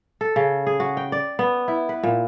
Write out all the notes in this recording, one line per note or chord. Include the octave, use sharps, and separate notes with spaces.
A4
C#3
G#4
F#4
G5
D5
B3
E4
B4
A#2